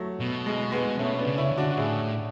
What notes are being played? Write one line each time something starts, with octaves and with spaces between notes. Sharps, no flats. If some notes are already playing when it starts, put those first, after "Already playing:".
Already playing: F#3 A3
B2
G#3
G#3 B3
B2 A3 C#4
B3 D4
C#3
C#4 E4
D3
D4 F#4
F#4
A2 E4 G#4